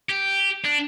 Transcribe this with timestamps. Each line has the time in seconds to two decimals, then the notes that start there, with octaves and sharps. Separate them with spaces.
0.09 G4
0.64 D4